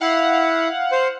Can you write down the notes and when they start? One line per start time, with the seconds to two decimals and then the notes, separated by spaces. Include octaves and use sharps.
0.01 E4 F5 F#5
0.92 C5